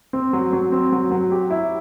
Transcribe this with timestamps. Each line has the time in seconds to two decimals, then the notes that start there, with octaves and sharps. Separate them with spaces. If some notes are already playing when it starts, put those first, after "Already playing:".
0.13 C4
0.33 F#3
0.53 F#3
0.72 C4
0.92 F#3
1.11 F#3
1.31 G4
1.50 E4